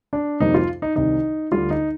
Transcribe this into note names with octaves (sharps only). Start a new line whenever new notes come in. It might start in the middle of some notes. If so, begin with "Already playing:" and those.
D4
F2 C3 G3 A#3 D#4
F4
D#4
C2 C3 D#3 D#4
D2 D3 G3 F4
D#4